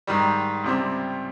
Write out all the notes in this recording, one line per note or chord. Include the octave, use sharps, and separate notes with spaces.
G#2 D#3 G3
C#2 C3 G3 C4